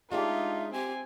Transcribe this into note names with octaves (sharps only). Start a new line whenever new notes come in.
G#3 D4 D#4 F4 G4 E5
C4 G4 G#5